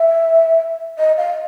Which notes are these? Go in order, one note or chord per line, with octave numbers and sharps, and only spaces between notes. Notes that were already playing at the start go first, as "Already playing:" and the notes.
Already playing: E5
D#5
F5